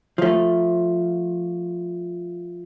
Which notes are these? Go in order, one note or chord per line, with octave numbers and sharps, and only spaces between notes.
F3 A3